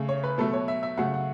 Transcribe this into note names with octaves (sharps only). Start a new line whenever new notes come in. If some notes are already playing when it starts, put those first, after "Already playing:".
Already playing: C#3 A3
C#5
B4
B2 F#3 A3 A4
C#5
E5
E5
C#3 F#3 A3 F#5
F#5